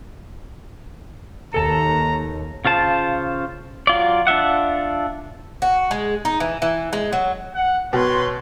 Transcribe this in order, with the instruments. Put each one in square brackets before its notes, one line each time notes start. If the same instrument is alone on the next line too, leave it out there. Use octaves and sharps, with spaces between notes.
[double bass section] D#2 [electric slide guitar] A4 A5 [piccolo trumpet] A#5
[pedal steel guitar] C#3 F4 C5 A5
F#3 F4 D5
D4 F4 E5 F#5
[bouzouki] F#4
G#3
D#4
E3
E3
G#3
F#3
[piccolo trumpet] F#5
[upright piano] B2 [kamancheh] B4 C6 [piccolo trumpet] C#5